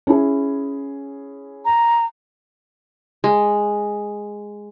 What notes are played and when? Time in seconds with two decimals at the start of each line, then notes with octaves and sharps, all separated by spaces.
0.07 C#4 E4 G#4
1.65 A#5
3.24 G#3